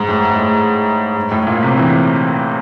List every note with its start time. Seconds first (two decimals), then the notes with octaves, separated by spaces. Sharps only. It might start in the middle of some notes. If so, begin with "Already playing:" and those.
Already playing: G#2
0.09 A2
0.24 A2
0.39 A2
1.16 G#2
1.32 A2
1.47 A#2
1.63 C3
1.77 E3